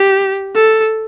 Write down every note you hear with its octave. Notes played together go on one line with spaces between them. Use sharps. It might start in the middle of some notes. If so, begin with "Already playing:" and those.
Already playing: G4
A4